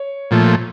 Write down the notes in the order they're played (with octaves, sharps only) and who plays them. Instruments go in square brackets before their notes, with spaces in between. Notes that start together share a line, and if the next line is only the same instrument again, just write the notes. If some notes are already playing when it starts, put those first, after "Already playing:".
Already playing: [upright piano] C#5
[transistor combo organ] A#2 F3 A3